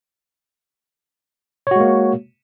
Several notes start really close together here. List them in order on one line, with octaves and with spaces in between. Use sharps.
C#5 F#4 G#3 A#3